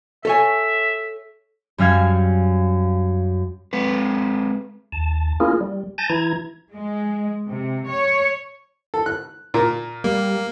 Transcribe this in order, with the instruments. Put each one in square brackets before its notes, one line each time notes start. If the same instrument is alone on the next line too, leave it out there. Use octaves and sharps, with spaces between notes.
[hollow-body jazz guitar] A4 C#5 G#5 [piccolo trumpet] E5
[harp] F#2 G3 C#4 F5 F6 G#6
[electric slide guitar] G#3 C4 B4
[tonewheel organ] D#2 A5
A#3 C#4 E4 F4 G#4 A#4
G3
G#5 A5 G6 A6 A#6
E3 E4 A#5 G#6
[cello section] G#3
C3
C#5
[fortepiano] A4
F#6
A#2 A#4
[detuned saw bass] G3 [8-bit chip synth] A#3